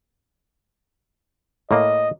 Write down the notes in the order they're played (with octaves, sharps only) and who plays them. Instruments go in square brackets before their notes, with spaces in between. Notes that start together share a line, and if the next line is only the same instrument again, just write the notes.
[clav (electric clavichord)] A2 A#3 [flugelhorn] D#5